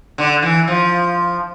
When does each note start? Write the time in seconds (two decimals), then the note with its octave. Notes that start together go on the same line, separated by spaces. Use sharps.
0.18 D3
0.42 E3
0.68 F3